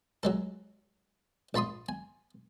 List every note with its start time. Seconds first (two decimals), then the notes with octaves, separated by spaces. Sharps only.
0.23 F#3 G#3 A4
1.54 A#1 A5 B5 C6 D#6
1.89 G#5